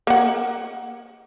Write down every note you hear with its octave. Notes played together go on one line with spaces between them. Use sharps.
A#3 F#5